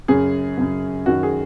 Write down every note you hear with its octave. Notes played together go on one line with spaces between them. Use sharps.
F#2 C#3 G#4
F#2 C#3
F#2 D#3 F#4
G#4